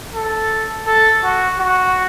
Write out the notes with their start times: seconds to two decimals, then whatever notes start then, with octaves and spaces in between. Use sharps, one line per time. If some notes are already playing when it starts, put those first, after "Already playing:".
0.15 A4
0.87 A4
1.24 F#4
1.60 F#4